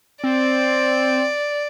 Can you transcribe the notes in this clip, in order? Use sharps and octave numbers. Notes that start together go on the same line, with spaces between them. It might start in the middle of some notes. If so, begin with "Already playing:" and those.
C4 D5